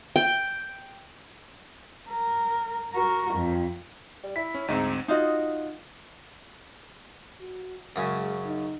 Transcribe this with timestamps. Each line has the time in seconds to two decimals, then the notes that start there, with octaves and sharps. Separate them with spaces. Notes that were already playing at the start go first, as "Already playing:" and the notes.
0.16 G5
2.10 A#4
2.92 F#4 A#4
3.34 F2
4.24 G3
4.36 E4 B6
4.54 C#4
4.68 D2 G#2 C4 D#4
5.08 D#4 F4 F#4 D#5
7.41 F#4
7.96 F#2 C#3 G#3 G#5
8.46 D#4